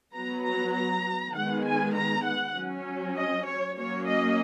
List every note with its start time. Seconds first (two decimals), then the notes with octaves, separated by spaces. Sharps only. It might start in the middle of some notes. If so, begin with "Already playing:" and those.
0.13 F#3 B3 A#5
0.44 A#5
0.74 A#5
1.34 D#3 G#3 B3 F#5
1.65 G#5
1.95 A#5
2.25 F#5
2.55 F#3 C#4
3.16 D#5
3.46 C#5
3.76 F#3 A#3 C#4 C#5
4.07 D#5